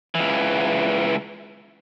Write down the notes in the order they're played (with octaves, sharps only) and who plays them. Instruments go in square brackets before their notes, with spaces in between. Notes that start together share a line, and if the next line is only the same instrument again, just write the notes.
[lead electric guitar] C#2 E3